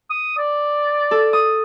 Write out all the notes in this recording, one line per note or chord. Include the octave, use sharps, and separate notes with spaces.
D#6
D5
A4
D#6